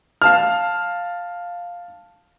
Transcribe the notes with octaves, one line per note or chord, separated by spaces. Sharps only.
F5 A5 F6